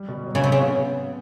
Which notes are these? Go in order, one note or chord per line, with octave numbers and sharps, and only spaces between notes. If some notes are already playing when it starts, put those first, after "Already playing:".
Already playing: G3
B2
F#3
C#3
C3 C#4
C#3
B3